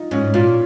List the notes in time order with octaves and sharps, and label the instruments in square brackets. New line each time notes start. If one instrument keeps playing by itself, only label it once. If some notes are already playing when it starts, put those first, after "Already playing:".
Already playing: [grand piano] D#4 F4
[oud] G#2 [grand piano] C#4
[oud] A#2 [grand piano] F4